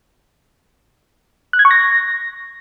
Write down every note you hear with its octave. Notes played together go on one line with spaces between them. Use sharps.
F#6
G#6
C#6
A#6